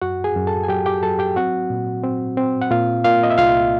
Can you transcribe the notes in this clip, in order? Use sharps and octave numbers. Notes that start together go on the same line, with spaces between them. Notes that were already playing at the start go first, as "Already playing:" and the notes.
F#2 F#4 F#5
G#4 G#5
F#2
A4 A5
G#5
F#3 G4 G5
G4 G5
F#3 A4 A5
G4 G5
C4 F#4 F#5
A#2
C4
C4
F#5
A#2 F4 F5
A#3 F4 F5
D#5
E5
C2 F4 F5